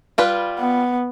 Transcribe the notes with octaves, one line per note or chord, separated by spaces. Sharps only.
G3 F4 B4
B3